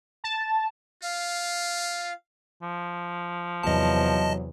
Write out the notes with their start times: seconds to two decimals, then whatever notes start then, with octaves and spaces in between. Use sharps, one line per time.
0.24 A5
1.03 F4 F5
2.62 F3
3.63 E2 C3 F#3 D#5 A5